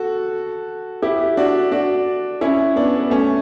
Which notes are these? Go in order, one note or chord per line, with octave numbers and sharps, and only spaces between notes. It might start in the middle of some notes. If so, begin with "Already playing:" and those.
Already playing: F#4 A4
E4 G4
D4 F#4
D4 F#4
C#4 E4
B3 D4
B3
A3 C#4